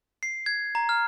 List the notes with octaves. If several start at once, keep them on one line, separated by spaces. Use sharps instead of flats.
C7
G#6
A#5
F6